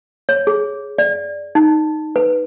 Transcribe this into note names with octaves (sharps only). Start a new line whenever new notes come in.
C#5
G#4
D5
D#4
B4